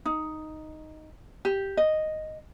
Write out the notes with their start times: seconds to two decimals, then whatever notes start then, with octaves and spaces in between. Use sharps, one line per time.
0.06 D#4
1.45 G4
1.77 D#5